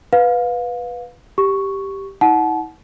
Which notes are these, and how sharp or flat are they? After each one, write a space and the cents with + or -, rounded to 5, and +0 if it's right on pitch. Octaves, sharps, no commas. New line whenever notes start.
B4 +0 F5 +25
G4 +0 C#6 +0
E4 -45 F#5 +0 A5 -35